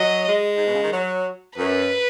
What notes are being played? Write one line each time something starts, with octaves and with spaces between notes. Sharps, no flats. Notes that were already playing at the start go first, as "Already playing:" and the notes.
Already playing: F#3 D#5
G#3
G#2
B2
C#3
D#3
F#3
F#2 B4